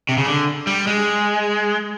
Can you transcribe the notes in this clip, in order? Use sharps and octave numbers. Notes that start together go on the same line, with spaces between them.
C3
C#3
D3
G3
G#3